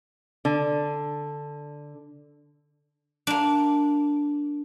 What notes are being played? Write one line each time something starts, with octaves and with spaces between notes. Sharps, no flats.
D3
A#3 D4